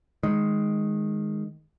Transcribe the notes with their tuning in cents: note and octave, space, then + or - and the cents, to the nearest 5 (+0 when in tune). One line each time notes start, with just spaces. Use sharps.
D#3 +0 G#3 +0